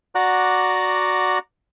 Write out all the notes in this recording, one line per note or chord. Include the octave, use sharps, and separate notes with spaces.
F#4 D5 F#5 A#5 D6 F#6